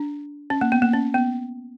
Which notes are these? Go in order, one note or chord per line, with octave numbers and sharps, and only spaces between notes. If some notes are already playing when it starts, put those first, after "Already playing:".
Already playing: D4
C#4
A#3
B3
A#3
C#4
B3